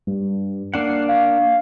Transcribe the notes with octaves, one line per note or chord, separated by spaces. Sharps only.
G2
A#3 D4 F#5 C7
F5